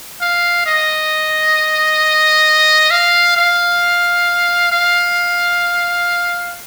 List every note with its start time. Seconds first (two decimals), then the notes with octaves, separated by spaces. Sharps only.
0.21 F5
0.66 D#5
2.91 F5
3.36 F5
4.72 F5